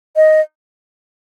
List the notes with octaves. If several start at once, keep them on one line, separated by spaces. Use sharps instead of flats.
D#5